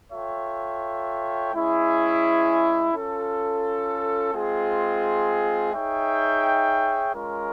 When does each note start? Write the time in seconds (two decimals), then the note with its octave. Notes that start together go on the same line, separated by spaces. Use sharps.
0.12 F4 A4 C#5 E5 G5
1.53 G#3 C#4 E4 G#4
2.93 C#4 F4 A4
4.33 G#3 C4 F4 G#4
5.73 D#4 G#4 C#5 E5 G5
7.13 G#3 C#4 F4 A#4